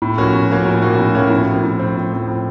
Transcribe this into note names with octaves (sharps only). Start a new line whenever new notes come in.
A2
F3 A#3 C#4 F#4
A2
F3 A#3 C#4 F#4
A2
F3 A#3 C#4 F#4
A2
F3 A#3 C#4 F#4
A2
F3 C4
A2
F3 C4
A2
F3 C4
A2